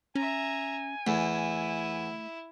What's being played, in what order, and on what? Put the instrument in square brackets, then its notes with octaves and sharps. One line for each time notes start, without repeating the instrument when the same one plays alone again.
[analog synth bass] C#4 [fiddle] E5 A#5 [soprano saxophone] G#5
[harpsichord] E2 [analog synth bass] A3 [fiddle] E4